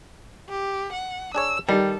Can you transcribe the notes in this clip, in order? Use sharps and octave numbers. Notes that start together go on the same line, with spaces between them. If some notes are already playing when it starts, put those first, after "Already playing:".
G4
F#5
D4 G#4 C#5 E6
D#3 G3 A4